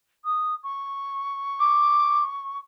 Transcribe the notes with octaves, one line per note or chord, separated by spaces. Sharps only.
D#6
C#6
D6